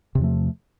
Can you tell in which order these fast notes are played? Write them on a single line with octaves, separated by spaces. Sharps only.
C3 E2 F3 A3